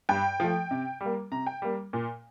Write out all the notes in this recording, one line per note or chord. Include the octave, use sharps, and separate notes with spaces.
G2 G5
F3 A3
C3
G3
A#3
C3 A#5
G5
G3 A#3
A#2